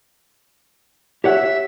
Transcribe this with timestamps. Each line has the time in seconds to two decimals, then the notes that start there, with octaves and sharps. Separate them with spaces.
1.24 G4 C#5 E5 F#5